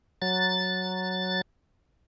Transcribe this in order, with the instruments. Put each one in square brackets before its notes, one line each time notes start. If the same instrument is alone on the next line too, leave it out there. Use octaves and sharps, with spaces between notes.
[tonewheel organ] F#3 A6